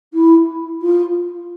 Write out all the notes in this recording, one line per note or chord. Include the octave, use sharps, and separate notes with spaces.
E4
F4